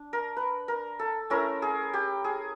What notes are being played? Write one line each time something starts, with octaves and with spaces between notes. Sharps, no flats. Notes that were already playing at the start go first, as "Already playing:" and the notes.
Already playing: D4
A#4
B4
A#4
A4
A3 C#4 E4 A#4
G#4
G4
G#4